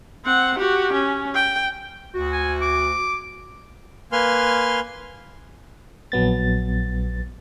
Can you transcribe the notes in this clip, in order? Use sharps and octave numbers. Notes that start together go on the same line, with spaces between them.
C4 F#5
F#4 G4
C#4
G5
D2 F#4
G#5
D6
A#3 B4 G#5 C6 F6
A#1 F#3 B3 A6